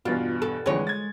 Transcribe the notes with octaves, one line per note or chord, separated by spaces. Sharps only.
E2 G2 B2 F4
A4
F2 D3 E3 G#3 C#5
G#6 A6